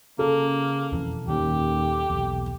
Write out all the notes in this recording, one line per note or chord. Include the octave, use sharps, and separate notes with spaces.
C#3 A#3 A4
E1 F2 E3
D#1 D#2 D#3 C#4 G4
B1 E2